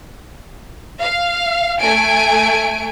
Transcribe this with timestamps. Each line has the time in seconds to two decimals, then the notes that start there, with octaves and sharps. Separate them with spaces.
1.01 F5
1.80 A3 G#5 D7